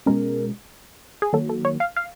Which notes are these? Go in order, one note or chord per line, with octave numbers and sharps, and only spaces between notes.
B2 G#3 C#4 A#4
G#4
D#3 F#3 A#3 A4
A4
C#5
F5
F5